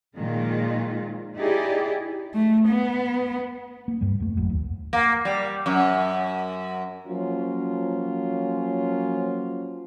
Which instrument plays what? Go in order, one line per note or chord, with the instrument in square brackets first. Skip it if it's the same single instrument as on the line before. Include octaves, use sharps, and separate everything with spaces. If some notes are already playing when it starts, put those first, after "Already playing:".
[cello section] A#2 D#3 F3 G#3 F4
D#4 E4 G4 G#4 D5
[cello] A3
B3
[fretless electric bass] A#3
G2 G3
F2 A3
G#1 F#2
D#2
[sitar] A#3
G3
F#2
[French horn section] F3 F#3 A#3 C#4 F4